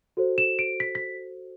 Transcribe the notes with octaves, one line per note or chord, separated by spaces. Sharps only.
F#4 A4 C5
E7
D7
B6
B6